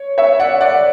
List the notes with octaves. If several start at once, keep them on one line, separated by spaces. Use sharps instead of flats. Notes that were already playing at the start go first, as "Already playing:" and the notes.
Already playing: C#5
C#5 E5
D5 F#5
D5 F#5